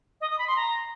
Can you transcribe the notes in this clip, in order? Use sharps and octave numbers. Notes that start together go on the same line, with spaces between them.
D#5
D#6
B5
C6
A#5